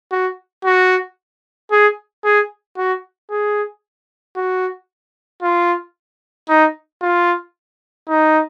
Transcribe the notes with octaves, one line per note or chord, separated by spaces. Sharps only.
F#4
F#4
G#4
G#4
F#4
G#4
F#4
F4
D#4
F4
D#4